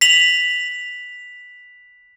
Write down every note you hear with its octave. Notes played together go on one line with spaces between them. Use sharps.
B6 F7 F#7